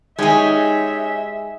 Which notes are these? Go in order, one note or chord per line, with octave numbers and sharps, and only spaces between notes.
G#3 C#4 D#4 G4 G#4 E5